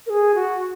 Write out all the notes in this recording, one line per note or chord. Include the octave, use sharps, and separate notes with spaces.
A#4
G#4
F#4